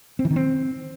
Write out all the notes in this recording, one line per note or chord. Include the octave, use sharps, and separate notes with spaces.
C4
E3
D#3
C4